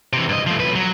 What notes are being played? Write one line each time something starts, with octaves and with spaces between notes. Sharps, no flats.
C3 E3
G2 D#5
F3 A3
B1 B4
F#3